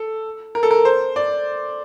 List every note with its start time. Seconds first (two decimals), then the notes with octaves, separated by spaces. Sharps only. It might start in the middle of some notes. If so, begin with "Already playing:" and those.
Already playing: A4
0.55 A#4
0.63 A4
0.71 A#4
0.85 C5
1.16 D5